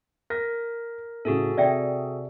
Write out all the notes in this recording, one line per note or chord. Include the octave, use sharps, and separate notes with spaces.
A#4 A#6
A2 C#3 F#4 G#4 A4
C3 D5 E5 G5